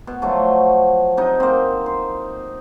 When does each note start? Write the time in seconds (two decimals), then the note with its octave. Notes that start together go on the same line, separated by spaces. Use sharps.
0.07 B2
0.22 F3 F#3 A3
1.17 C3 D#4
1.40 A#3 C4
1.86 C6